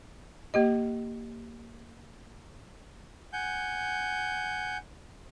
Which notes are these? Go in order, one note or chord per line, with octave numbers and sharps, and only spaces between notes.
A#3 G4 D#5
F#5 G#5 G6